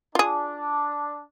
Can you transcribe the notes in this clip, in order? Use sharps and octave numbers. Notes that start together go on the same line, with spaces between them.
D4 F4 G#4